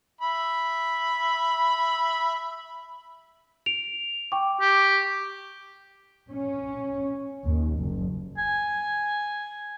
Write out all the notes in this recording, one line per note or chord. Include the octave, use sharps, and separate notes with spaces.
E5 B5
D7 F7
G5 C#6 D6
G4
C#4
D#2
F#1
G#5